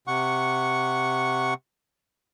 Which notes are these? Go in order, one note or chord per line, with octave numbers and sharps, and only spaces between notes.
C3 F#5 C#6